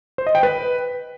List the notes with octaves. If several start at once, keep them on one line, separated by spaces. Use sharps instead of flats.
C5
D#5
G5
B4